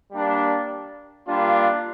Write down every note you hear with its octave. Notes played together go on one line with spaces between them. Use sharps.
G3 A#3 D4
G3 A#3 D4 F4